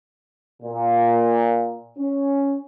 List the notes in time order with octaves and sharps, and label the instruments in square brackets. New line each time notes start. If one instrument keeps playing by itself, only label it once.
[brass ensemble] A#2
C#4